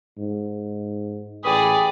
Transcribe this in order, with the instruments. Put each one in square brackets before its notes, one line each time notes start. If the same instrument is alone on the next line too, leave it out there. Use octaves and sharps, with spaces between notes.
[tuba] G#2
[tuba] A1 [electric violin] G#4 D5 [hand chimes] B4 G5 [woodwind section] B5 D#6